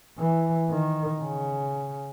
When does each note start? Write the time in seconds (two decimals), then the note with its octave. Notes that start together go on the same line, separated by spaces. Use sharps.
0.18 E3
0.70 D#3
1.20 C#3